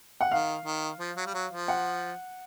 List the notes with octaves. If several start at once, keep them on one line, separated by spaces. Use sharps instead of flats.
F#5
D#3 F5
D#3
F3
F#3
G3
F#3
F3
F#5